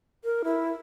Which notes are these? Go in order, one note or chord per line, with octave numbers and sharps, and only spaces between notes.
A#4
E4